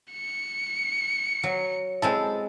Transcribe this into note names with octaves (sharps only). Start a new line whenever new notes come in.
C#7
F#3
G#3 C4 E4 A4